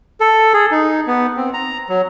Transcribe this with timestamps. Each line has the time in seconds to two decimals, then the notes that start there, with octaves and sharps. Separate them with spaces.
0.20 A4
0.54 G#4
0.71 D#4
1.07 B3
1.37 C4
1.54 A#5
1.89 F#3